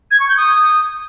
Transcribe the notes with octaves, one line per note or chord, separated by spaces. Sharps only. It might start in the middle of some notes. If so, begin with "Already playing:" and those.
G#6
C#6
G6
D#6